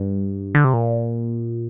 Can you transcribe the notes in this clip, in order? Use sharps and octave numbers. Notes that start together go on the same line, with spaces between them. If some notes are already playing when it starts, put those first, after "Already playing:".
Already playing: G2
D3
C3
A#2